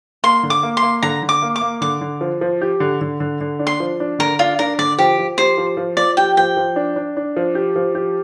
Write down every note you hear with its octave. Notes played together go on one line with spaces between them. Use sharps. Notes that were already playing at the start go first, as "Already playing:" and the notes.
A#3 C6
D3
D6
A#3
C6
A#3
D3 A#5
D3
D6
A#3
D6
A#3
D3 D6
D3
F3
F3
G4
D3
D3
D3
D3
D4
C6
F3
D4
D3 A#4
D4 F4
D4 A#4
D3 D5
F3 G4
F3
G4 C5
F3
F3
F3 D5
G4 G5
F3 G5
F3
D4
D4
D4
F3
G4
F3
G4